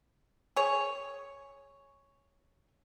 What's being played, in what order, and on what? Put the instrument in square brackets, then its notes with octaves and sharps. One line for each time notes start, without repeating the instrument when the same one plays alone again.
[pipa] G#4 C#5